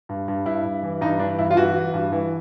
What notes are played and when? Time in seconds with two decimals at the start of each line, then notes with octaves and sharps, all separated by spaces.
0.09 G2
0.28 G2
0.46 G2 E4
0.65 G2
0.83 E3
1.01 G2 D#4
1.19 E3 D4
1.39 G2 E4
1.51 F4
1.57 E3 F#4
1.75 E3
1.94 G2
2.12 E3